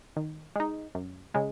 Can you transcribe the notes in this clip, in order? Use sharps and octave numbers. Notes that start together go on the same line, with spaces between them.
D#3
G#3 D#4
F#2
C#3 G#3